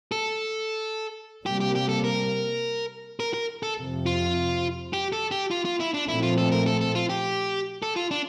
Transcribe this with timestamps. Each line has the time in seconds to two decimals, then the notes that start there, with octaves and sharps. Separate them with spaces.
0.12 A4
1.46 C3 G3 A#3 G4
1.60 G4
1.75 G4
1.89 A4
2.04 A#4
3.20 A#4
3.34 A#4
3.63 A4
3.78 F2 C3 F3
4.06 F4
4.93 G4
5.12 A4
5.31 G4
5.51 F4
5.65 F4
5.80 E4
5.94 D4
6.08 A#2 F3 A3 C4 E4
6.23 F4
6.38 A4
6.52 A#4
6.66 A4
6.81 A4
6.95 F4
7.10 G4
7.83 A4
7.96 F4
8.11 D4